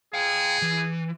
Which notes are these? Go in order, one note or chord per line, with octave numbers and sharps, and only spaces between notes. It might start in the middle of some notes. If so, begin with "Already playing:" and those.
G#4 F5 G5
E3